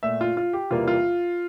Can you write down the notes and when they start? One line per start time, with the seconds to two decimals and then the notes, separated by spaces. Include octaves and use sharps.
0.03 A#2 A3 E5
0.21 F4
0.37 F4
0.53 G4
0.71 E2 C3 G3 A#3 F4
0.88 F4